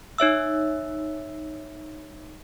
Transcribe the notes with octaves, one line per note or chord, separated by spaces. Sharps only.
D#4 C#5 E5 E6